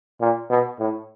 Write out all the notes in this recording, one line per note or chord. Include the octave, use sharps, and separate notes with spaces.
A#2
B2
A2